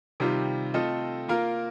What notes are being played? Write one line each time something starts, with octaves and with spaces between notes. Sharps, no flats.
C3 D#3 G3 C4 F4
A3 C4 F4 A4 D#5
A#3 F4 A#4 F5